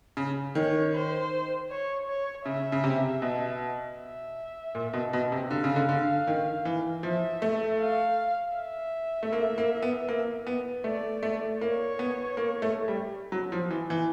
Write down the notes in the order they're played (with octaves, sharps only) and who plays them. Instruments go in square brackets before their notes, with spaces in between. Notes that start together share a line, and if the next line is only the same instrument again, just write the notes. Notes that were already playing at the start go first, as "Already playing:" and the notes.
[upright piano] C#3
[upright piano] D#3 [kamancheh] C#5
[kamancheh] C5
C#5
C#5
[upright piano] C#3 [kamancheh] E5
[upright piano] C#3
C3
B2
[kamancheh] E5
[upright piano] A#2
B2
B2
C3
[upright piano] D3 [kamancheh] F5
[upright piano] C#3
D3
D3
D#3
E3
[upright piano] F3 [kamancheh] E5
[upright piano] A3
[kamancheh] F5
E5
[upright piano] A3
A#3
A#3
B3
A#3
B3
[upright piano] A3 [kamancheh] D5
[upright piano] A3
[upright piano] A#3 [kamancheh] C#5
[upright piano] B3
A#3
A3
G3
F#3
F3
E3
E3